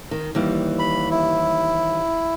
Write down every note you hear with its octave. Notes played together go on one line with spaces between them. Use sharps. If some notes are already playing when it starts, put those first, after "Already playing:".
D#3
D#2 E3 G3
B5
E4